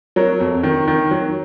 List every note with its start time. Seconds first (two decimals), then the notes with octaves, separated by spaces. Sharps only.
0.16 F#3 A#4 C#5
0.40 F2
0.63 D#3
0.88 D#3
1.11 F#3